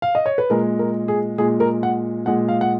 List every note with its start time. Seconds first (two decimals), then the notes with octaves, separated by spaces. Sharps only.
0.02 F5
0.15 D#5
0.26 C#5
0.38 B4
0.50 A#2 G#3 A#4
0.79 A#4
1.08 G#4
1.38 A#2 G#3 G#4
1.60 A#4
1.83 F#5
2.26 A#2 G#3 F#5
2.48 F5
2.61 F#5